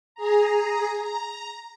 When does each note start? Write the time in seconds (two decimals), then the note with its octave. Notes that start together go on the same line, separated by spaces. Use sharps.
0.15 G#4 A#5
1.02 A#5